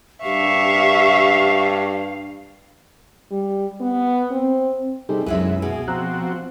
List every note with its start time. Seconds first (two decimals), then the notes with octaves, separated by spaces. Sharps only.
0.24 G2 G4 E5 F5 C#6
3.32 G3
3.80 B3
4.31 C4
5.09 C3 G3 D#4 G#4 A4
5.26 C2 F#2 B2 G#3 B3 E4 B4 E5
5.62 B2 G#4
5.88 F3 C4 F#4 A#5 E6 F#6